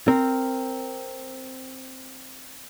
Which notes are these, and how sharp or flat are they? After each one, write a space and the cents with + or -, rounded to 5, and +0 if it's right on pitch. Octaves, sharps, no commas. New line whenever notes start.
C4 +0 A#4 -10